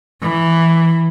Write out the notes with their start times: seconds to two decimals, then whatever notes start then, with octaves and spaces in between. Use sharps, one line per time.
0.21 E3